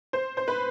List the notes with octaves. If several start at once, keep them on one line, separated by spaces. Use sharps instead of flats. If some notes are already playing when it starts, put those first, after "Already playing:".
C5
C5
B4